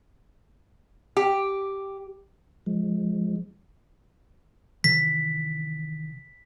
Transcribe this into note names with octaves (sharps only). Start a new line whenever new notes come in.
G4
F3 G#3
C3 D#3 E3 B6